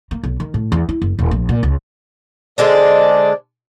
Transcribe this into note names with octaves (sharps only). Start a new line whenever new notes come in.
A#3
B1
D#3
A2
E2
E4
F#1
D#1
A#1
A#2
C#2
D3 G#3 D4 C5 D5 D#5